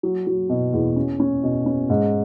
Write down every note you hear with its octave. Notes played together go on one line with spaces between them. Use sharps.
F#3
F#3
B2
E2
C#4
C#4
B2
C#4
G#2